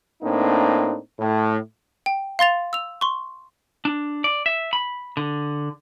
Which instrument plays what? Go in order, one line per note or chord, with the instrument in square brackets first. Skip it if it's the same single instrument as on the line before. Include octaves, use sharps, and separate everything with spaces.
[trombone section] A2 A#3 C4 D4 D#4
A2
[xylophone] G5
F5 C6 A6 F7
E6 F7
C6 C#6
[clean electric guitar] D4
D5
E5
B5
D3